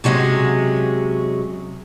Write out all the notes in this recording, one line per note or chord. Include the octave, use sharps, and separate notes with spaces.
C3 F#3 G#3 C#4